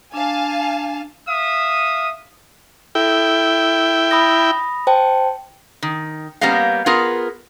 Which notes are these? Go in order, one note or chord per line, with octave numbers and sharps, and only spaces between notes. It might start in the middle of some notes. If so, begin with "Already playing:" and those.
D4 F5 G#5 A5
E5 F5 D#6
E4 A4 G5
B5 D#6 A#6
C5 G5 A5
D#3
G3 A#3 B3 C#4 D#5 F5
B3 F4 G#4 A#4